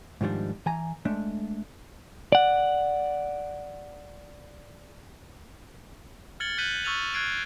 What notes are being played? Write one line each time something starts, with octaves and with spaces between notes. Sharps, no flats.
G#2 D#3 F3 G3 D4
E3 G#5 A#5
G#3 A3 D4
D5 F#5
F6 G#6 A6 C#7 F#7 G7
F#6 G6 B6 D#7 F#7
C#6 E6 F6 A6 D#7 F7
F6 F#6 G#6 C7 D7